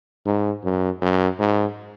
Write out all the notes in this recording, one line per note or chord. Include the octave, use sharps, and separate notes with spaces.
G#2
F#2
F#2
G#2